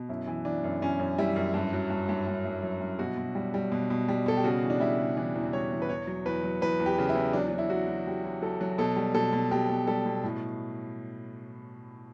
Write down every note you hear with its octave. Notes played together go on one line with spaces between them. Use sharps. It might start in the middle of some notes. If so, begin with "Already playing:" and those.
Already playing: B2
F#2 E4
E3
E3 D4
F#2
F#2 C#4
F#2
G3 E4
F#2
G2
F#3
G2
G2
G2
G2
F#3
G2
B2 F#4
B2
G3
G3
B2
B2
G3
B2 A4
G4
C#3 F#4
E3
D4
G3 E4
C#3
E3 D4
E2
G3 C#5
E2
B4
E2 C#5
F#3
E2 B4
F#3
E2 B4
E2
G4
C#3
E4
E2
F#3 D4
F#3 D4
E4
F#3 F#4
F#3
F#3 G4
F#3
F#3 A4
F#3
B2 A4
G3
B2 A4
B2
B2 G4
B2
G3 A4
B2
A2